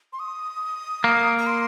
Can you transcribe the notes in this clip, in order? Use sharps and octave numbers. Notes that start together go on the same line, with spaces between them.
C6
D#6
A#3
A#5
C6